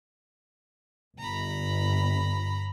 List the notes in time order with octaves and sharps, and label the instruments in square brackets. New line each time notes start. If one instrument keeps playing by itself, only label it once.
[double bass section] G1 [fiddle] A#5 B5